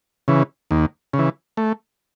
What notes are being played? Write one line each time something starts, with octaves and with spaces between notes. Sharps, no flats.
C#3 E3
D#2
C#3
E3
A3